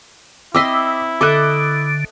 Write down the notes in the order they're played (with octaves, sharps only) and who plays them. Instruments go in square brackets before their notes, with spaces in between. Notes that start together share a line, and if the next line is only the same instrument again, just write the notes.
[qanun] C4 D#5 C6 [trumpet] E4 [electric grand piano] D6 E6 B6
[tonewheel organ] D3 [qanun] A4 D#5 E5 [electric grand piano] D6 F#6